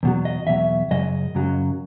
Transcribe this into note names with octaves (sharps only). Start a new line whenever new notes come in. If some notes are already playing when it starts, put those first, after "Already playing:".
E2 B2 F#3
D#5
E2 B2 F#3 E5
F#2 C#3 F#3 D#5
F#2 C#3 F#3